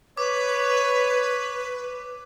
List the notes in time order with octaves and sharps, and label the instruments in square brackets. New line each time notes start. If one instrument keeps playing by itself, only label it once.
[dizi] B4 [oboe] C#5 [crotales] D6